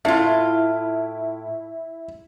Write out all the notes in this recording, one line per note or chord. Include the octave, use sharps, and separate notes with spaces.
A2 E4 F4